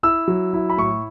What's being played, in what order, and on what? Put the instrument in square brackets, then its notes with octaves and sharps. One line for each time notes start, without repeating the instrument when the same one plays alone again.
[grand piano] E4 E6
F#3
E4
B5
A2 C#6